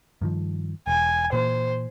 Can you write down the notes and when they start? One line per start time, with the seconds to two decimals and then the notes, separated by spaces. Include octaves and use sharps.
0.22 G2 D#3 F3
0.87 E1 G#5
1.33 A#2 E3 A#3 C5